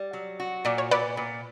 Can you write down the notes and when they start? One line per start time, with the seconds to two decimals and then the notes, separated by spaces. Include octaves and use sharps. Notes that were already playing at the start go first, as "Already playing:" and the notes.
Already playing: G3
0.13 F#3
0.40 F#4
0.65 A#2 D5
0.78 C#5
0.91 A#2 B4 D5
1.17 A#2